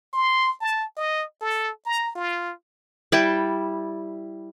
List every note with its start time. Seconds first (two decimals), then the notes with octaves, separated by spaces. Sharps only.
0.13 C6
0.61 A5
0.97 D#5
1.41 A4
1.86 A#5
2.15 F4
3.12 G3 E4 G5 A5